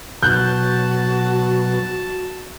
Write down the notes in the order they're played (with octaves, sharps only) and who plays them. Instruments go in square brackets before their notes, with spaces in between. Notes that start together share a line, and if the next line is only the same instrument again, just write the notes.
[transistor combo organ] B2 F#3 [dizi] F#4 [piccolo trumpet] A5 [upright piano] F#6 G6